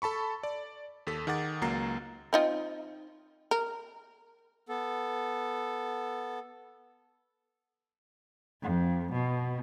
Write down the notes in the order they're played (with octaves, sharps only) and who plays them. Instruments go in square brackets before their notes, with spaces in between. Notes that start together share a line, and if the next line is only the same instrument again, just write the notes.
[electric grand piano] A4 A5 B5 C#6
D5
D#2 A4 B6
D#3 G#4 F#5 D6 A6
C#2 F#3 A#3 A#5 A6 C7
[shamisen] C4 D#4 F4
A#4
[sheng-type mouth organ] B3 A4
[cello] F2
B2